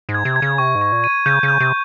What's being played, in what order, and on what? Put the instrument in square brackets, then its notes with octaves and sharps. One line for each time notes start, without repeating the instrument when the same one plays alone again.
[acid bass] G#2
[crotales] G#6
[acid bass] C3
[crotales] G#6
[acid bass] C#3
[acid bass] C3 [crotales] C#6
[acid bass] G#2
[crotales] C#6
[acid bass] A#2
[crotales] D#7
[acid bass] C#3 [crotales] G6
[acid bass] C#3
[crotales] G6
[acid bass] C3